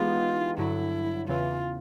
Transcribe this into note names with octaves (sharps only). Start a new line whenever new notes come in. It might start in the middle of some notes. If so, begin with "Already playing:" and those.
Already playing: E3 G#3 B3 D#4 F4 G4
G2 D3 F#3 E4
E2 C#3 E3 F4